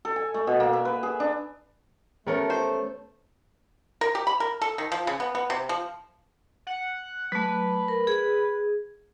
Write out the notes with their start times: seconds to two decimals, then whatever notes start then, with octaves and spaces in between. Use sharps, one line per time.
0.05 A4
0.16 G#5
0.34 A3
0.47 B2
0.60 A#3
0.73 E5
0.85 B4
1.03 G#4
1.20 D4
2.27 A3 B3 C#4 G4 A4 A#4
2.50 C5
4.01 A#4
4.15 G4
4.27 B5
4.40 A#4
4.62 A4
4.78 D#3
4.92 F3
5.07 C#3
5.20 B3
5.35 B3
5.50 C3
5.69 F3
6.67 F#5
7.32 F#3 A3 B4
7.88 A#4
8.07 G#4